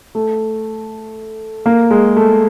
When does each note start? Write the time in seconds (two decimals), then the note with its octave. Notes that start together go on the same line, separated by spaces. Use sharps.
0.15 A3
1.66 A#3
1.91 G#3
2.16 A3